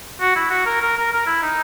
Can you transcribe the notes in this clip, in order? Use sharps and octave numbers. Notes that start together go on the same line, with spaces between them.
F#4
E4
F#4
A#4
A#4
A#4
A#4
E4
D#4